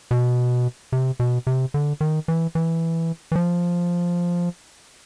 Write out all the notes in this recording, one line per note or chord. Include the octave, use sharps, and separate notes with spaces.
B2
C3
B2
C3
D3
D#3
E3
E3
E3
F3